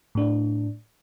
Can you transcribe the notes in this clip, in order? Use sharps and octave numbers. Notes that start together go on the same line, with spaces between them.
A2 D4